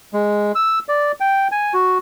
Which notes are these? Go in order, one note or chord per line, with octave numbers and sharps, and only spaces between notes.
G#3
E6
D5
G5
G#5
F#4